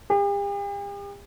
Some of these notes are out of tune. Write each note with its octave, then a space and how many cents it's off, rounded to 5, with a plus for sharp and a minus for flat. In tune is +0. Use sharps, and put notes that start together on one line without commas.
G4 +45